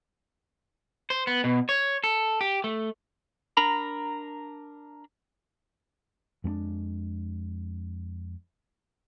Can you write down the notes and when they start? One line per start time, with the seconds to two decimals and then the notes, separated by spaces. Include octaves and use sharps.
1.10 C5
1.27 B3
1.44 B2
1.69 C#5
2.04 A4
2.41 G4
2.64 A3
3.57 D4 A#4 A#5 B5
6.44 F2 G#3 C4 D4